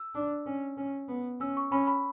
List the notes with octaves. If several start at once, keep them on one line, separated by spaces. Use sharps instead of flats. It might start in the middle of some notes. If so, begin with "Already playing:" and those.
Already playing: E6
D4
C#4
C#4
B3
C#4 E6
C#6
C#4 B5
B5